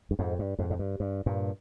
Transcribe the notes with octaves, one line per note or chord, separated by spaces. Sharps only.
G2
F2 G#2
G2
F2 G#2
G#2
G2
G2
G2 A#2